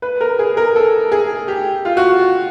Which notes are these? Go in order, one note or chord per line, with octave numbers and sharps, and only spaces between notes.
B4
A#4
G#4
A#4
A4
G#4
G4
F4
F#4